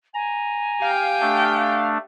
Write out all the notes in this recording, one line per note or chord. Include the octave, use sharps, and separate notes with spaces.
G#5 A#5
G4 F5 G5
A3 D4